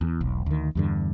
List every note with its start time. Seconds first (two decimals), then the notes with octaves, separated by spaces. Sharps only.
0.01 E2
0.21 E1 B1
0.46 D2 D#3
0.75 E2 G2 D3